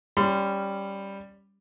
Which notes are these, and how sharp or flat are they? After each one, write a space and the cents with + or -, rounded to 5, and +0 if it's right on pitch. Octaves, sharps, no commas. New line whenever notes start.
G3 +5 C#4 +0 C6 -35